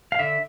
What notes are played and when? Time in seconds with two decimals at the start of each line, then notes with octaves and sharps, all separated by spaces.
0.12 F5
0.19 D3 E5